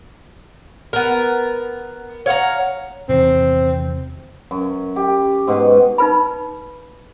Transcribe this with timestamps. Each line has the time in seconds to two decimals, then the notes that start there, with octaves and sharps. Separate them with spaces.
0.93 B3 A#4
2.26 C#5 F5 F#5 A#5
3.09 E2 C3 D#3 C4
4.51 F#2
4.96 G4
5.47 G#2 B2
5.98 D#4 B4 B5